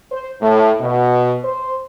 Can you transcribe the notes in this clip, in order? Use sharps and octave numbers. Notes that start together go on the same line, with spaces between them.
C5
A2
B2
C5